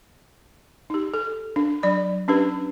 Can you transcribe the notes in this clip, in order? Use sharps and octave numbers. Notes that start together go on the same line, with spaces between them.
D#4 G4
A4
D4
F#3 D5 B5
C#4 D4 G4 B4